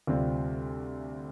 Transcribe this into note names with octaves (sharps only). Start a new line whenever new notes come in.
D2 C3 G3 C4 F4